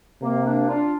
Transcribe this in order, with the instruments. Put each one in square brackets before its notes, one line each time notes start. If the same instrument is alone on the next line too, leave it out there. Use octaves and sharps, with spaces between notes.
[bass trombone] C3 [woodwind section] A#3
[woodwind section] A#3 D4
D4 F4